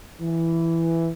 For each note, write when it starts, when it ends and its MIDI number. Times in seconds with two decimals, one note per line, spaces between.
0.21 1.11 52